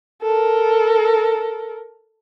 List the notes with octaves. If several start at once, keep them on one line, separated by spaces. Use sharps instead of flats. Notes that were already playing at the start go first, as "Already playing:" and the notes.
A4 A#4